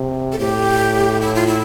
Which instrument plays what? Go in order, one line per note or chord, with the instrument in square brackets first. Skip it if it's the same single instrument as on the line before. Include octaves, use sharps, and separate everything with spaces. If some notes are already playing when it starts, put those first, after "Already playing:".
Already playing: [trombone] C3
[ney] A4
[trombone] A2 [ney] G4
[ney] E4
F4
E4